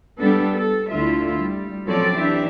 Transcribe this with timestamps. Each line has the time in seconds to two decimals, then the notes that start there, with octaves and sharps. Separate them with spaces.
0.19 G3 B3 D4 A4
0.58 A4
0.92 D2 D3 E4 F4 E5
1.41 G3
1.86 F3 F#3 C4 C#4 A4 D5
2.16 E3 D4 G4 E5